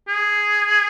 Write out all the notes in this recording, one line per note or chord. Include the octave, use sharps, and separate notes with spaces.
G#4